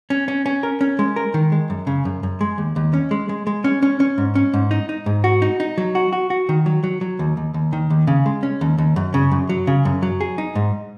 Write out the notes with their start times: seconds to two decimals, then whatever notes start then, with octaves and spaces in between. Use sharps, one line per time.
0.10 C#4
0.28 C#4
0.46 C#4
0.63 A#4
0.81 C#4
0.99 G#3
1.16 A#4
1.34 D#3
1.52 G#3
1.70 F#2
1.87 C#3
2.05 F#2
2.23 F#2
2.41 G#3
2.58 D#2
2.76 D#2
2.94 C#4
3.11 G#3
3.29 G#3
3.47 G#3
3.64 C#4
3.83 C#4
4.00 C#4
4.18 G#2
4.35 C#4
4.54 G#2
4.71 D#4
4.89 D#4
5.06 G#2
5.24 F#4
5.42 D#4
5.60 D#4
5.78 F#3
5.95 F#4
6.13 F#4
6.30 F#4
6.49 D#3
6.66 F#3
6.84 F#3
7.01 F#3
7.19 D#2
7.37 D#2
7.54 D#2
7.73 D#3
7.90 D#2
8.07 C#3
8.26 G#3
8.43 C#4
8.61 D#2
8.78 D#2
8.96 F#2
9.14 C#3
9.32 F#2
9.49 F#3
9.67 C#3
9.85 F#2
10.02 F#3
10.21 G#4
10.38 D#4
10.55 G#2